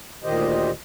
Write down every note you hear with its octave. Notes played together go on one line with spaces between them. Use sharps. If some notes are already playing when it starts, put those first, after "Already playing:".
D2 A#2 D#3 G4 C5 D#5